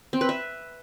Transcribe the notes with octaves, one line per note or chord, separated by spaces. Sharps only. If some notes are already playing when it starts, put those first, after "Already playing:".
C4
B4
E5